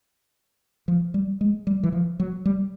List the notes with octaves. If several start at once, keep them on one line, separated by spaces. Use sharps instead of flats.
F3
G3
G#3
G3
E3
F3
F#3
G3